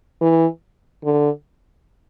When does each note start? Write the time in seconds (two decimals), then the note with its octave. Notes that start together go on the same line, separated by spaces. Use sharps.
0.21 E3
1.05 D3